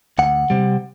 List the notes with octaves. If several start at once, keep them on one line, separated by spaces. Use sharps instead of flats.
D2 F#5
C3 G3 C4